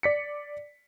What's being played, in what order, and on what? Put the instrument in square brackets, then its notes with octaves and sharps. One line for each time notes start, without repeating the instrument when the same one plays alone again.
[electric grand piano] D5 B6 C#7